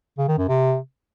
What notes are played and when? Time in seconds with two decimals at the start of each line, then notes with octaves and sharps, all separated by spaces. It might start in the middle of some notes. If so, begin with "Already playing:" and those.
0.18 C#3
0.28 D#3
0.38 F#2
0.48 C3